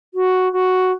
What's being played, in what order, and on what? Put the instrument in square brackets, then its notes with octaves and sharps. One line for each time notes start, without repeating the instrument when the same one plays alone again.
[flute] F#4
F#4